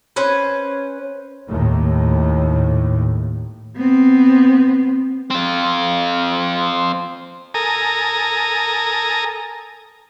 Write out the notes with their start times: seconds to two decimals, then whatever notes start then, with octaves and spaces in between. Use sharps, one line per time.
0.16 C#4 B4 C5
1.47 D#2 A2
3.77 B3 C4
5.30 C4 F4
7.54 A4 A#4 G#5 A#5 D#6